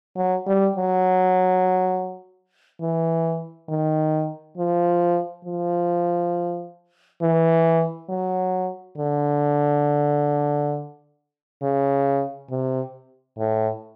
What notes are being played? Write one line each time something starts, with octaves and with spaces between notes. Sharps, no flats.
F#3
G3
F#3
E3
D#3
F3
F3
E3
F#3
D3
C#3
C3
A2